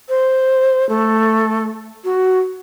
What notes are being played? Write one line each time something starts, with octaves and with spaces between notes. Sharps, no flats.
C5
A3
F#4